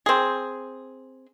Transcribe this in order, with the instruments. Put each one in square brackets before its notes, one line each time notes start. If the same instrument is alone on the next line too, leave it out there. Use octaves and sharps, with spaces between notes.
[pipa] C4 G#4